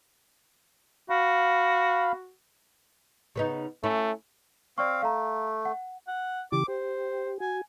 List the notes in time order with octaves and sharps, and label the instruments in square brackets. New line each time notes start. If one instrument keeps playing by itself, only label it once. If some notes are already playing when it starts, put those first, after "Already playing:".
[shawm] F#4 [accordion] F5 B5
[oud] C#3 B3 D#4
[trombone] A3 [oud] C#4 E4
[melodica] C4 F5 [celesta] D5 C#6
[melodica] A3 [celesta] F5 A#5
[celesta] F#5
[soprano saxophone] F#5
[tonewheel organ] C#3 E3 G4 [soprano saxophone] D6
[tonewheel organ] G4 [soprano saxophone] C5
[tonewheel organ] F#4 [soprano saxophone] G#5